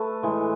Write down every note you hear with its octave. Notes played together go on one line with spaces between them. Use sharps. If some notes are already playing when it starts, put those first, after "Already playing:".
Already playing: A3 A4 B4
A2 E3 G#3